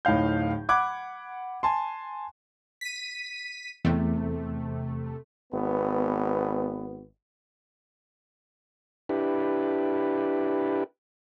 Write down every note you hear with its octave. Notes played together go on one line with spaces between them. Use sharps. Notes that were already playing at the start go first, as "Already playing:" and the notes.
D1 A2 D#4 F5 G6
F#5 B5 D6 F#6 G#6
G#5 A5 C6
B6 D#7
E2 C3 A3
G#1 B3
D4 E4 G4 B4